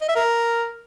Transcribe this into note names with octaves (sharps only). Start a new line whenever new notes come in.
D#5
E5
A#4